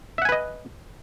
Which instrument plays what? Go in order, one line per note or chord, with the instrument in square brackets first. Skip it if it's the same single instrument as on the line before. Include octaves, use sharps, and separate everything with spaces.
[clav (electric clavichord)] E5
F#5
G#5
B4
D#5